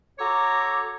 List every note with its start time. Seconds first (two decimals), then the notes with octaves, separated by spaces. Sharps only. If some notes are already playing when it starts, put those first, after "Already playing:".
0.19 F#4 A4 C#5 A#5 D6